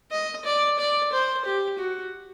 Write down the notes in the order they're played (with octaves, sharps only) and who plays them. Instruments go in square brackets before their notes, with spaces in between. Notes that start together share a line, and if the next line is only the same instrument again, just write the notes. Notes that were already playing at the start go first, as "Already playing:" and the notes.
[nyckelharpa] D#5
D5
D5
C5
G4
F#4